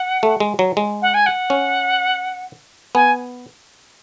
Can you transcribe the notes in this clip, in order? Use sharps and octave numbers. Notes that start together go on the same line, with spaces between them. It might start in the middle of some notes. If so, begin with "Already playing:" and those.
Already playing: F#5
A3
G#3
F#3
G#3
F#5
G#5
F#5
C#4
B3 G#5